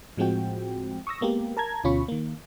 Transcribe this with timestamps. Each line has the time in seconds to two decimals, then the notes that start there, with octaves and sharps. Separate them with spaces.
0.17 A2 F3 G#3 C4 F#4 G5
1.07 C#6 D#6 E6 A#6
1.21 G#3 A#3 B3 G4
1.57 A#4 A5 A#5 G#6
1.84 D2 B2 C#4 F4 B5 C#6
2.08 D#3 A#3